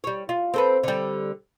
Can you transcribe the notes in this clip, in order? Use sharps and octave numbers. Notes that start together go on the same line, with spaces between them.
G3 C#5
F4
C4 A4 B4
D3 G3